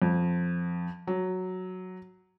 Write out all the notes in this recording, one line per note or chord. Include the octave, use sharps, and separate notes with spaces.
F2
F#3